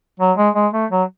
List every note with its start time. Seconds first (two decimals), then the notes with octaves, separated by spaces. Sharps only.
0.20 F#3
0.37 G#3
0.55 G#3
0.73 A3
0.90 F#3